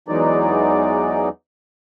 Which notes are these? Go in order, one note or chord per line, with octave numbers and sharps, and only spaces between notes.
E2 E3 F#3 G#3 D#4 D5